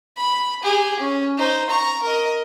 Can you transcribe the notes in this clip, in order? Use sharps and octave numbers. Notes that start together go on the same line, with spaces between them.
B5
G4 G#4
C#4
D#4 C5
A#5 C#6
A#4 D#5